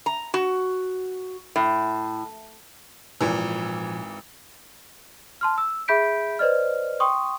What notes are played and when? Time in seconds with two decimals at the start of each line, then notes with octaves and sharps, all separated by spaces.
0.06 A#5
0.34 F#4
1.56 A2
3.21 G#1 A#2 E3 F3
5.41 A5 C6 F6
5.58 E6
5.88 G#4 E5 B5 G6 B6 D7
6.39 B4 C5 D5 D#5 F6
7.00 G5 C6 C#6 D#6